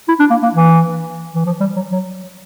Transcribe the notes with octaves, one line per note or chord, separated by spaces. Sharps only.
E4
D4
A#3
A#3
E3
E3
F3
G3
F#3
F#3